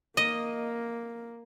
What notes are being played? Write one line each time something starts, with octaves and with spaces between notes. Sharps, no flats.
A#3 D#5